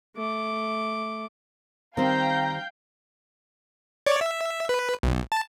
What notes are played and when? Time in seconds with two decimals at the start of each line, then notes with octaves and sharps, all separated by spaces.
0.16 A3 D6
1.97 D#3 G3 C4 C5 F5 G5 A#5 G6
4.06 C#5 D5
4.21 E5
4.69 B4
5.03 B1
5.32 A5